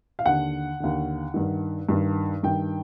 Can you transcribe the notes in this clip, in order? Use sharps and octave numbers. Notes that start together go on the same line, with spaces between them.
F5
D#2 D3 F#5
D#2 D3
G2 D#3
G2 D#3
G2 D#3 G5